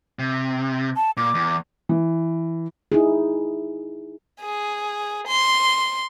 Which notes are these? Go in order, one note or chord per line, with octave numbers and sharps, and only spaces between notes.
C3
A5
A#2 D6
E2
E3
D#4 E4 G#4
G#4
C6